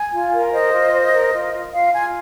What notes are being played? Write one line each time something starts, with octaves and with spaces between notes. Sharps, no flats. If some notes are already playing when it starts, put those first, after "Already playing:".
Already playing: G#5
F4
A#4
C5 D#5
F4
C5
A#4
F4
F4
F4 F5
F4 G#5